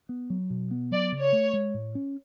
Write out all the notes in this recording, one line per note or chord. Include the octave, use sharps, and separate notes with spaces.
B3
F#3
B2
B3
F#3 D5
C#3
C#5
A3
G#3
A2
C#4